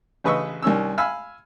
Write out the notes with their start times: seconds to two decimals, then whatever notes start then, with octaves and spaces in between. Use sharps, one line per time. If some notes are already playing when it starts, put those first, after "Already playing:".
0.24 A1 C#3 B4 D#5 C#6 E6
0.63 C2 D#3 C#4 E6
0.98 F5 G#5 B5 E6 F6